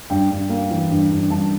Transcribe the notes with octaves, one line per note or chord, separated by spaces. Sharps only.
G2 G5
G2
A#3
E3
G2
G2
G2 A5